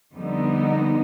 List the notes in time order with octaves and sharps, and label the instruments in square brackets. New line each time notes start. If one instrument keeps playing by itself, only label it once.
[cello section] F2 D3 G3 B3 D#4